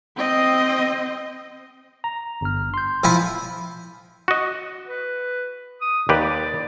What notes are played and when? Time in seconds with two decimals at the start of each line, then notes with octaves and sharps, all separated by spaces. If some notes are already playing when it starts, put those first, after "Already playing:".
0.16 C4 D#5
2.04 A#5
2.41 G1 F6
2.74 C6 G6
3.04 F3 E4 G#5
4.28 F#4 D#5
4.87 B4
5.81 D#6
6.09 D#2 G4 B4 D5